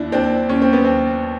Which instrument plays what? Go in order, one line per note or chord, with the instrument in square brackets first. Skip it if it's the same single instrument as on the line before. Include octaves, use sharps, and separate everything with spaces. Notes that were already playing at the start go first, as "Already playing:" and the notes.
Already playing: [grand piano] D#2 D4 E4
D#2 C4 D4
D#2 C#4
C4
B3
D#2 C4